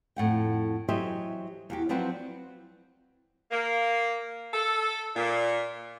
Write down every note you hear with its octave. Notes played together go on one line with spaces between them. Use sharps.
F2 A2 F#5 G5
E3 F#3 G4 C5 D#5 E5
E2 F#4 G4
F3 F#3 C4 B4 C5 D5
A#3
A4
A#2